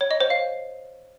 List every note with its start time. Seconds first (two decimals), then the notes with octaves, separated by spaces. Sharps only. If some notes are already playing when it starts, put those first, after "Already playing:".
0.01 C#5
0.11 D#5
0.20 C5
0.30 F5